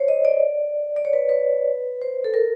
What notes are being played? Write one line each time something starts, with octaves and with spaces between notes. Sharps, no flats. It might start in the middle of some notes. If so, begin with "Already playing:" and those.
Already playing: C5 C#5
D#5
D5
D5
C#5
B4
B4
C5
A4
A#4